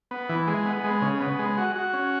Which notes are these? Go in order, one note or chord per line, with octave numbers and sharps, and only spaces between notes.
B3
E3
G#3
B3
G#3
C#3
B3
G#3
F#4
F#4
C#4